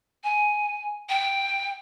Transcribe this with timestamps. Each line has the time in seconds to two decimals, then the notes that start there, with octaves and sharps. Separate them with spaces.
0.24 G#5
1.09 G5